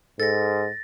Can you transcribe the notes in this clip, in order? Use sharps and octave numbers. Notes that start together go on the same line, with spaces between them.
G#2 A4 A6 A#6